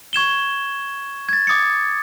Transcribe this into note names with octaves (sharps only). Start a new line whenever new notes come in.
C#6 G#6 E7 G7
G#6 A6
D6 D#6 A6 C#7